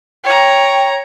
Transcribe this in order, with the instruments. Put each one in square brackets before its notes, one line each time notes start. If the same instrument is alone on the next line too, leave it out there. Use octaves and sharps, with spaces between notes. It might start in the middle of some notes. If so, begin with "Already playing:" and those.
[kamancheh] C#5 A#5 [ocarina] G5